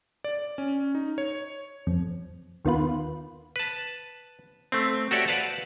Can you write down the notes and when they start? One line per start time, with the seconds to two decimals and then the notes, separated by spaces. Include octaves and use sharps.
0.24 D5
0.58 C#4
0.95 D#4
1.18 C#5
1.87 F2
2.65 D#2 D#3 B3 F4 B4
3.56 B4 A5
4.72 A3 C4
5.11 F#4 G4 A4 C#5 D5 E5
5.28 B4 D5 F5 F#5 A5